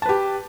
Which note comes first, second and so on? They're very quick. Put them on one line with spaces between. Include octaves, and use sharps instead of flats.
A5 B4 G4